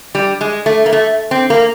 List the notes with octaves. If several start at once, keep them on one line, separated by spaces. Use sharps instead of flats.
G3
G#3
A3
A#3
A3
C4
A#3